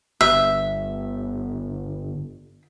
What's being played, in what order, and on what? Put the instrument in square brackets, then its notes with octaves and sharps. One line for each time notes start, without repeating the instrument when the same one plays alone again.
[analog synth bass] G1 [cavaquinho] E5